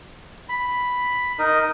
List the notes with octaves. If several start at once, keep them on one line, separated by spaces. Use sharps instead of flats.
B5
D#4 A#4 D#5